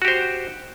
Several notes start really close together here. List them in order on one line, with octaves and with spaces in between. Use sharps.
F#4 G4 C5